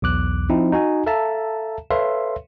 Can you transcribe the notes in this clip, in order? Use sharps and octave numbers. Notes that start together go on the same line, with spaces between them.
B1 E2 D6 F#6
F3 C4 D#4 E4
D#4 F#4 G#5
A4 E5 F5 A5 A#5
A4 B4 C#5 E5 F5 C6